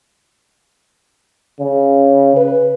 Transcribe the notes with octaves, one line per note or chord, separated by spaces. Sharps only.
C#3
B4